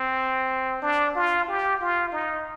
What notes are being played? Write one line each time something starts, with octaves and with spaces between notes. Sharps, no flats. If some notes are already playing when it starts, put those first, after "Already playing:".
Already playing: C4
D4
F4
G4
F4
D#4